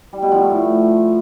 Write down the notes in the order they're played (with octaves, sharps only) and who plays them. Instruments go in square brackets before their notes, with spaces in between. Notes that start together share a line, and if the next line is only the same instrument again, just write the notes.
[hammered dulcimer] G3
B2
F3
A3
A2